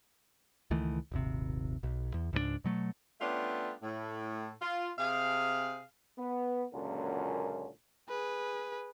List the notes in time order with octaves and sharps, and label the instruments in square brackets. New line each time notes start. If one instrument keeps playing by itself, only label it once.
[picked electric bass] C#2 D#3 E3 A3
D#1 G#1 C3
B1
E2
C#2 G#2 F#3 D4
B2 F#3 A3
[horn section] G3 A3 B3 C#4 D4 F4
A2
F4
C3 G#4 F5
[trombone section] B3
C#2 F#2 A#2 D3 A#3 C#4
[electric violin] G#4 B4